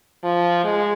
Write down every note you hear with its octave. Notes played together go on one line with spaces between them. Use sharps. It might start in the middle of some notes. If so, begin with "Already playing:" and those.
F3
G#3